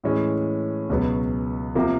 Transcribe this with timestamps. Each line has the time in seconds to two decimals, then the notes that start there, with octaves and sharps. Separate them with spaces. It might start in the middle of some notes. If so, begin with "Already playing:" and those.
0.04 A2 E3 G#3 C#4
0.89 C#2 B2 F#3 B3
1.75 C3 F3 A#3